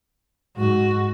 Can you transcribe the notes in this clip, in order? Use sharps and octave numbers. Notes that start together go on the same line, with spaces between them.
G#2 F#4